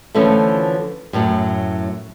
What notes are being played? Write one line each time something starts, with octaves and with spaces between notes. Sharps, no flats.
D3 E3 F3 A3 C#4
F#2 A2 F#3